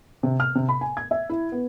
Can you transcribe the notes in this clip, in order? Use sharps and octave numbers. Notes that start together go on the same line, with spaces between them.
C3
F6
C3
B5
G#5
G#6
E5
E4
B3